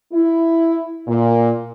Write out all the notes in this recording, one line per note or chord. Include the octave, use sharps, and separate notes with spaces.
E4
A#2